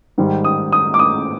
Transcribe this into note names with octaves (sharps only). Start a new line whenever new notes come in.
G#2 D#3 G3
D#6
D#6
D6
D#6